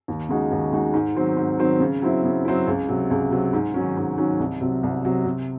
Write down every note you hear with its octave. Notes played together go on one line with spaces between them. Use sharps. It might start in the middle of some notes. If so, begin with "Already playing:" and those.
D#2
C#3 G#3 D#4 F#4
D#2
C#3 G#3 D#4 F#4
G#2
D#3 F#3 C4
G#2
D#3 F#3 C4
C#3
F#3 C4 E4
C#3
F#3 C4 E4
C#2
C3 F#3
C#2
C3 F#3
G#2
D#3 F#3 C#4
G#2
D#3 F#3 C#4
C2
C3 F#3
C2
C3 F#3
C3